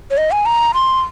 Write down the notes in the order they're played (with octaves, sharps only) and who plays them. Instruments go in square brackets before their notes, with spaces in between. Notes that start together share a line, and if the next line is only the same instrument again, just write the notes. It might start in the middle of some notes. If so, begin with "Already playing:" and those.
[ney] C#5
D#5
G#5
A#5
C6